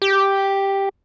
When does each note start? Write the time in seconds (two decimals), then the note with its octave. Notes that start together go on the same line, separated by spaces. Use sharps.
0.02 G4